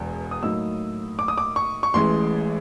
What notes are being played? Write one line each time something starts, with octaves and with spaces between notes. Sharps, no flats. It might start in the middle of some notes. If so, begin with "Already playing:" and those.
Already playing: E1 E2
D#6
A2 F#3 A#3 D#4 E6
D6
D#6
D6
C#6
C#6
A1 A2 E3 G#3 C6